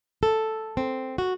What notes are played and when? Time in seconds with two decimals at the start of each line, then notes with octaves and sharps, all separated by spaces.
0.23 A4
0.77 C4
1.18 F#4